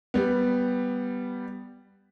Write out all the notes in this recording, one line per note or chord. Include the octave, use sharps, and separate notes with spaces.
G3 B3